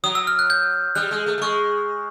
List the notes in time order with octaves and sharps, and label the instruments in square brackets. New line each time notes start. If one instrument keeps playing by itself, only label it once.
[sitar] F#3 [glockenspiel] D#6
[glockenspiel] E6
F6
F#6
G6
[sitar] G3 [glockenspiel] F#6
[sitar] G#3
A3
A3
[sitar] G#3 [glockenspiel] C#6